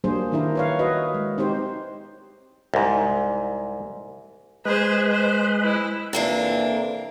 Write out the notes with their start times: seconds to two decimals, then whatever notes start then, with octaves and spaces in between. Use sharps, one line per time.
0.04 F#3 G3 A#3 D4 G#4 C5
0.32 D#3 D4 E4 A#4
0.55 B4 C#5 F5
0.79 F#4 B4 D#5
1.14 G#3
1.38 C4 D#4 G4 C5
2.74 C2 G#2
4.65 G#3 G#4 B4 C5
5.11 C5
5.64 E4
6.13 F2 C3 E3 A#3 D4